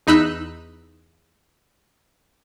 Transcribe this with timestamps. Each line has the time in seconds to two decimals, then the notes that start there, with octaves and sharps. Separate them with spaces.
0.07 E2 D#4 B5 E6 F#6